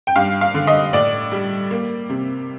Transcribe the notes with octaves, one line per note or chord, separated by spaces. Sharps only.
G5
G2 F5
F5
D3
D#5
A2 D5
G3
A#3
C3